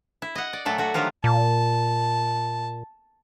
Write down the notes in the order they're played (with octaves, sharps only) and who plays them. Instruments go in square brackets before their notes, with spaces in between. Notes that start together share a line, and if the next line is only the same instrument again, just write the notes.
[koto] E4
D#5 F#5
D5
A#2 F#3 A3 A4
A3 F#4
D3 D#3 F3 F#3 F4 G4
[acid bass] A#2 [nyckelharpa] A5